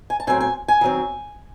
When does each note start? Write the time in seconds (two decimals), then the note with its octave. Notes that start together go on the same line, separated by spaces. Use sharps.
0.10 G#5
0.20 A5
0.27 A2 F#3 C4 G#5
0.41 G#5
0.68 G#5
0.81 D#3 F#3 C4